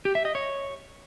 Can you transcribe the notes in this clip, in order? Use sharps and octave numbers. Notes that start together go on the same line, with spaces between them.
G4
E5
D#5
C#5